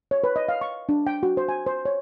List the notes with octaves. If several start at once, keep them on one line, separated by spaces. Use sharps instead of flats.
C#5
B4
D#5
F5
C#6
D4
G5
F#4
C5
G#5
C5
C#5